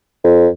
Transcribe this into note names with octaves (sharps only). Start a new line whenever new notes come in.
F2